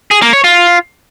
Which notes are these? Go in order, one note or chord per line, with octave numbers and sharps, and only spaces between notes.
G#4
A#3
C#5
F4